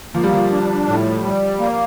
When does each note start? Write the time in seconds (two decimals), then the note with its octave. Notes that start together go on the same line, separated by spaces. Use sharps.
0.15 F3 A#3
0.24 G3
0.33 F3
0.51 D4
0.87 A2
1.24 G3
1.60 A#3